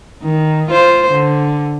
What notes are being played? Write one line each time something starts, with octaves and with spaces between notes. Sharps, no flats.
D#3
F4 C5
D3